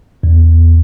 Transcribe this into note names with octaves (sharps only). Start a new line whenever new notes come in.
E2